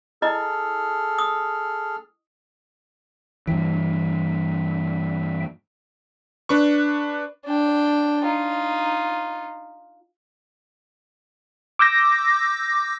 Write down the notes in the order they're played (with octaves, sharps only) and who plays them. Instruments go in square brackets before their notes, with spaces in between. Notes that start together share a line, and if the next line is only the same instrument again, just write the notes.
[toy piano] E4 D#5 A#5 [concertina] G#4 A4 F6
[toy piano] D#6
[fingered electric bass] G2 E3 [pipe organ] E5 G5
[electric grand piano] D4 B4 C#6
[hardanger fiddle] D4 G5
D#4 F4
[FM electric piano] D6 E6 G6 A#6